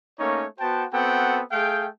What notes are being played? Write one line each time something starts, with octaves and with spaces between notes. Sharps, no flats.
A3 A#3 C#4 D#4 C#5
B3 F#4 C5 G5 A5
B3 C4 F#4 A4 F#5 G5
A3 G#4 F5 G5